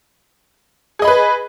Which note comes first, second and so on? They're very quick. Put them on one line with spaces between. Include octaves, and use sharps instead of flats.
G#4 D#5 B5 B4